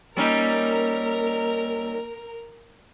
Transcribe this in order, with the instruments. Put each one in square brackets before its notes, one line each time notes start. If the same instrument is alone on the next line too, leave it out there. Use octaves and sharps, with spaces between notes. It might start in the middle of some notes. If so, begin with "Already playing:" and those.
[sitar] G3 C#4 D#4 [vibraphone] A#3 E6 [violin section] A#4